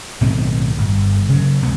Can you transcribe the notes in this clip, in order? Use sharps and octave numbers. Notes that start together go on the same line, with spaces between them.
B1 A2 D#3 C4
G1
C#3 F#3
E1 C#2 F#2 B3